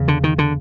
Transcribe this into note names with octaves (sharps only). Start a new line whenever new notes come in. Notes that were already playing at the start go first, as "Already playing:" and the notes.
Already playing: E2 C#3
D3
D#3
D3